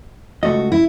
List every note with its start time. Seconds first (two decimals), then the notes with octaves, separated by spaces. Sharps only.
0.43 C#2 A3 F#4 D#5
0.72 E4